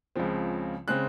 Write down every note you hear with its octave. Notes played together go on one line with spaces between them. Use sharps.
C#2 C#3 F3 C4
C#3 G#3 C4 F#6